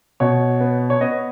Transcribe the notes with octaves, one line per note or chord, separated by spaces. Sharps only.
B2 C#5
B3
C#5
B3 D#5